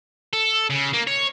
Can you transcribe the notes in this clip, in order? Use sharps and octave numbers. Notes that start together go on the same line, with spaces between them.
A4
C#3
A#3
C#5